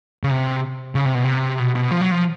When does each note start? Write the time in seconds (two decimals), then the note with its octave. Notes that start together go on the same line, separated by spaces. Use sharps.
0.24 C#3
0.31 C3
0.95 C#3
1.05 C3
1.15 B2
1.24 C3
1.59 B2
1.75 B2
1.91 F3
2.01 F#3
2.11 F3